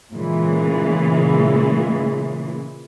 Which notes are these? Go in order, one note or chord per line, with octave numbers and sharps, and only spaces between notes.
A#2 C#3 E3 G#3